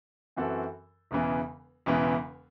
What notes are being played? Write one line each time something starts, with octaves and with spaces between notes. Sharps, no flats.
F#2 E3 C4 F#4 A4
E1 E2 C#3 E3
E1 E2 C#3 E3